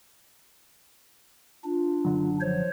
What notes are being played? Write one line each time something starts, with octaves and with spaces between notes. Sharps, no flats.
D4 F4
F#1 D3 F#3
F3 C5 C#5